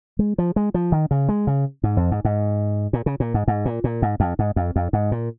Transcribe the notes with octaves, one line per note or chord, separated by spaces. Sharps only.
G#3
F3
G#3
F3
D#3
C#3
G#3
C#3
G#2
F2
G#2
G#2
A#2
C#3
A#2
G#2
G#2
A#2
A#2
G#2
F2
G#2
F2
F2
G#2
A#2